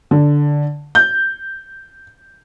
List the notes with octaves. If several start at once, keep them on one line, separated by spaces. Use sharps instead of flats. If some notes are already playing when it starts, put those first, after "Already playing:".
D3
G6